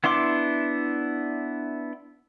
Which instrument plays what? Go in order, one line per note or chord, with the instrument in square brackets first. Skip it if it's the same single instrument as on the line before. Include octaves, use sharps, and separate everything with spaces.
[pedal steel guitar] B3 D4 E4 C6 D6